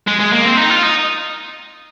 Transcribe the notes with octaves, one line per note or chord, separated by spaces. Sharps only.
G#3
G#3
A#3
C4
D#4
F4
D#4